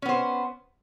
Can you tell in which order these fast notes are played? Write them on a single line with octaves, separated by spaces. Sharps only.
C#4 B3 C5